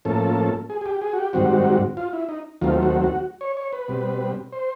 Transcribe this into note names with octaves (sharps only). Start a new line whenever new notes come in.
A2 F3 A#3 C#4 A4
G#4
G#4
G4
G#4
F#4
G4
G#2 D#3 G3 C4 F#4
F4
E4
D#4
D#2 D#3 F#3 A3 C4 F4
F#4
F#4
C#5
C#5
B4
B2 G3 C4
C5